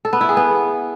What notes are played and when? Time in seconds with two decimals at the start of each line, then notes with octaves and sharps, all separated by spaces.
0.05 A4
0.13 B3
0.21 E4
0.29 G#4
0.37 B3